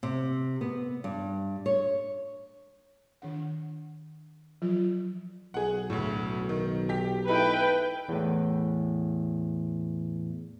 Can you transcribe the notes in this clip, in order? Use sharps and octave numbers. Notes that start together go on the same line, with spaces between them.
C3
B3
G2
C#5
D#3 D4 F#5
F3 F#3 F4
B1 G#4 F#5
D2 A2
D#3
G4 B6
D#4 E4 A4 B4 G5
E2 A2